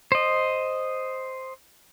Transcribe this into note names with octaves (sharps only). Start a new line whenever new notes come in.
C5 D#5